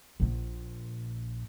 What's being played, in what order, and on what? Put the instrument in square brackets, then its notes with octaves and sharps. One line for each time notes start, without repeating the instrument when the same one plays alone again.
[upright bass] A#1 A#2